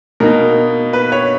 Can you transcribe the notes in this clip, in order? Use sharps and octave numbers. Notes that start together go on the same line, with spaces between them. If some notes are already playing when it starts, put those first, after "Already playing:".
B2 A#3 D#4 A#4
B4
C#5